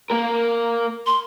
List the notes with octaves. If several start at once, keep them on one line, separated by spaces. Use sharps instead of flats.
A#3 A#4
C6